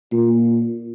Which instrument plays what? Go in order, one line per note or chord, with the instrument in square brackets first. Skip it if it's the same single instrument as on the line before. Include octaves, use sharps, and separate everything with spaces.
[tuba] A#2